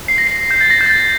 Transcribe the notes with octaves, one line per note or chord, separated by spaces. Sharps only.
C7
A#6
C7
G6
A6
A#6
G6
A6